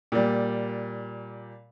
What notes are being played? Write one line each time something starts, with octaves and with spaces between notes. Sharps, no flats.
A#2 G3